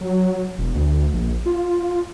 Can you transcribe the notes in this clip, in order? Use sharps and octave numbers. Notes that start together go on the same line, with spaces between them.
F#3
E1
D2
A#1
F4